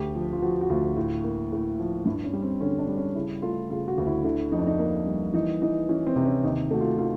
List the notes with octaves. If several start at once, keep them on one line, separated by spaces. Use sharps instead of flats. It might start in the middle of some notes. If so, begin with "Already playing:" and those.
Already playing: D2 G4
F3
F4
F3 F#4
F#4
D2 F4
A2
A#3
A2
F3
G2 E4
C#4
G3
C4
D3 C#4
D4
G3
C#4
C#3 E4
A3 F4
C#3 F4
F#4
D2
E4
D3 E4
F2 D#4
D4
D#4
A#3
G3
E3 D#4
E3 D#4
E3 C#4
C4
C3
C#4
D#2 D#4
A3 F#4
F4
D#3 F4